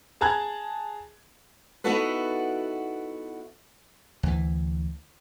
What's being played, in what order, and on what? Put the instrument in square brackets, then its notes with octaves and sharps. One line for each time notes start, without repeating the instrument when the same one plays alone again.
[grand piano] G#4 A5 A#5 F#6 G#6
[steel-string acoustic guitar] B3 D#4 E4 F#4 A4 B4
[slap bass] D2 E3